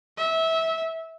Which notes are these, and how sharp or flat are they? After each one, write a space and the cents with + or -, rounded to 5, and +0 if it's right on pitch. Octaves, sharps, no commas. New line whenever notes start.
E5 -20